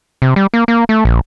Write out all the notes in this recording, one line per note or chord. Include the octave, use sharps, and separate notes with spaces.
C3
G3
A#3
A#3
A3
A#1